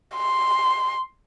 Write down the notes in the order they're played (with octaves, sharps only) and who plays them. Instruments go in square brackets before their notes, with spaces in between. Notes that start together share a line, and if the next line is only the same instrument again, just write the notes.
[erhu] C6